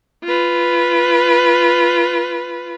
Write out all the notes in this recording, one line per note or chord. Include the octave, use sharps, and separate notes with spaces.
F4 B4